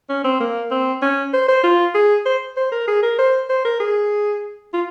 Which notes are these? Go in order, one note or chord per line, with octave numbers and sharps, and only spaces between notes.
C#4
C4
A#3
C4
C#4
C5
C5
F4
G#4
C5
C5
A#4
G#4
A#4
C5
C5
A#4
G#4
F4